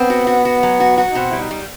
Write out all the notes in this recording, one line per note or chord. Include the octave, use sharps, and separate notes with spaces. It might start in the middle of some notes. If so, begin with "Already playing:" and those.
Already playing: B3 C4
F#4
F#4
F#4
F#3
F#4
F#4
D#4
B2 C4
G3 E4
D#4
G3